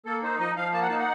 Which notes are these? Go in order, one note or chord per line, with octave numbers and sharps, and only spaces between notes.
A#3 A4
D#4 C5
F3 D#5
F3 F5
A#3 A5
F#5
D#4 A5
F#5